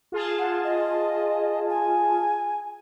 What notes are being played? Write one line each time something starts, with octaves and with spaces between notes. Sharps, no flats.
F4 G#4 A5
F#5
D#5
G#5